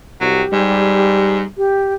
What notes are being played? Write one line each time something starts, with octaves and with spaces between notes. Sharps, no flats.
C2 F#3 G4
G#2 G3
G4